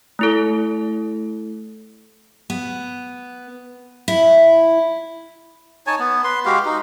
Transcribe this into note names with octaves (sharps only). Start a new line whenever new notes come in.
A3 E4 A4
B3
E4
D#4 C#5 G#5 A5
B3
B4 C6
G#3 F#4 G4 F5
D#4